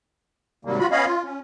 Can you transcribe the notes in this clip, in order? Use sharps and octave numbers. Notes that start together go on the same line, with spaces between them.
G#2 C3 D#3 F#3 G3 A#3
F4 F#4 B5
B3 C#4 C#5 D#5 F5 B5
F4
C#4